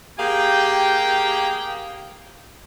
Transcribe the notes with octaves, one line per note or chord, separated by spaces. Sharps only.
A#3 G4 G#4 F5 G5